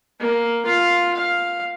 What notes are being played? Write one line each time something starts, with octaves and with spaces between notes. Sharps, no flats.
A#3
F4 F5
F5